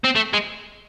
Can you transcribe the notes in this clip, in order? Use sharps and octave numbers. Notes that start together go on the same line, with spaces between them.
C4
A3
G#3